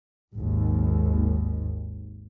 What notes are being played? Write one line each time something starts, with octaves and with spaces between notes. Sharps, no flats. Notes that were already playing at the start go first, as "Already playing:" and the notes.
G#1 D#2